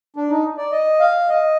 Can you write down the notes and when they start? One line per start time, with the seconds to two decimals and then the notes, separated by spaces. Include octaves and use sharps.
0.16 D4
0.29 D#4
0.58 D5
0.72 D#5
1.00 F5
1.29 D#5